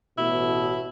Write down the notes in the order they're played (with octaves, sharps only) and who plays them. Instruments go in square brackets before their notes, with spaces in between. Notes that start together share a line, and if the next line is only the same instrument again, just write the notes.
[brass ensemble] A1 B2 [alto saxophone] E4